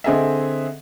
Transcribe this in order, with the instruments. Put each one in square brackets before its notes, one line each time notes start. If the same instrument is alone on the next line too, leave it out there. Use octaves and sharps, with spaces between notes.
[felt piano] D3 C4 G#4 D#5 E5